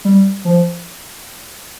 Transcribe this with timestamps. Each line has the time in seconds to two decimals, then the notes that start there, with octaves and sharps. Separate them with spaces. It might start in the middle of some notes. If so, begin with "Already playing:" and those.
0.05 G3
0.45 F3